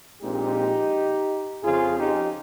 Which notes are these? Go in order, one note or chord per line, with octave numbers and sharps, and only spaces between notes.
A#1 A#2 G#3 C4 D#4 G4
F2 C#3 F3 F4 G#4
D#4 G4